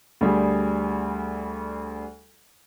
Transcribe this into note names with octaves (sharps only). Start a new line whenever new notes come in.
D2 G3 G#4